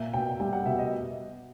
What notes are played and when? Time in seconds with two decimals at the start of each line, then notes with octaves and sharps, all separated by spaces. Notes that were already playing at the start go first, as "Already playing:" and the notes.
Already playing: A#2 A#3 E5
0.14 B2 G5
0.40 G3 G5
0.53 F#5
0.66 B2 E5
0.79 D#5